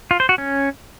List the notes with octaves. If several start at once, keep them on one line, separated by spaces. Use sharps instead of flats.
F4
C5
F#4
C#4